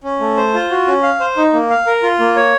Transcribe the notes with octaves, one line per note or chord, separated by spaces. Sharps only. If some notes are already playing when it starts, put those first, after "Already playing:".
C#4
A3
C5
F4
F#4
C#4
F5
C5
D#4
A#3
F5
A#4
F4
A#3
C#5